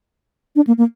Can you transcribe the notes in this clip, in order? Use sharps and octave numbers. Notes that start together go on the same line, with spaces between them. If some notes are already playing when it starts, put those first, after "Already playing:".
D4
A#3
A#3